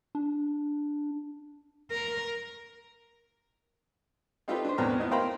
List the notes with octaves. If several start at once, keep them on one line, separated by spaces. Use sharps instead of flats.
D4
A#4
C4 D#4 F4 G4 A4 B4
D4 C5
E2 A2 B3 C4 A#5 F6
B3 D#4 E4
A#4 C5 F5 G5 A#5 B5